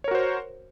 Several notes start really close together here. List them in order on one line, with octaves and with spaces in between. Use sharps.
C#5 A#4 F#4 C5